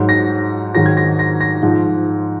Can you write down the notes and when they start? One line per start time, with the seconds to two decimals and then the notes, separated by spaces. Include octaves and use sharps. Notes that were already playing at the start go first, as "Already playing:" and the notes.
Already playing: G#2 F#3
0.09 A#6
0.75 G#2 D#3 F#3 A#6
0.86 G#6
0.97 A#6
1.19 A#6
1.41 A#6
1.63 G#2 F3